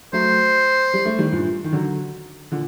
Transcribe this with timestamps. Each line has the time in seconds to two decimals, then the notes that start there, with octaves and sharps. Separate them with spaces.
0.13 F#3 A3 C5
0.94 G3
1.05 A3
1.19 D#3 G3
1.32 G2 A#2
1.64 D#3
1.72 D3 F#3
2.52 A#2 D3